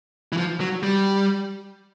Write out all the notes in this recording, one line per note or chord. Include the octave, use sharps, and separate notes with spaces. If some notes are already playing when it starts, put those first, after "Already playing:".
E3
F3
F#3
G3